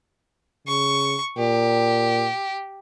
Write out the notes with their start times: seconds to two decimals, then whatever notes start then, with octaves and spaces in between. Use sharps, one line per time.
0.67 C#3 C#6
1.38 A#2 G4